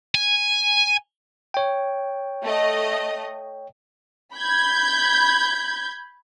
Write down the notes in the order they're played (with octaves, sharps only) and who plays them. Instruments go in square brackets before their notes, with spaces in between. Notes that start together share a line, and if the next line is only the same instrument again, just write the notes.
[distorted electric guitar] G#5
[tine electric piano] C#5 G5
[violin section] A3 D#5
[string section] B5 G6 G#6